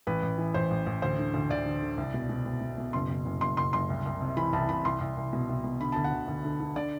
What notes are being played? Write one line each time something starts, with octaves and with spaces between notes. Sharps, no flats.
A1 B4
A1
E3
A1 C5
A1
A1
D2 C5
D3
D2
D2 D5
D3
D3
C2
B2
B2
B2
B2
B2
F#1 C6
F#1
F#1
F#1 C6
F#1 C6
F#1 C6
C2
C2
C3
E3 B5
C2 A5
C2 B5
C2 C6
C2
C2
B2
C2
B2
D3 B5
D2 A5
F#5
D2
D2
D3
D3
D3 D5